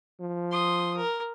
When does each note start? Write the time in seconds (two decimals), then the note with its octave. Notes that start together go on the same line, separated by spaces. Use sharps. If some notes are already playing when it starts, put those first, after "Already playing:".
0.20 F3
0.51 C6 D#6
0.96 A#4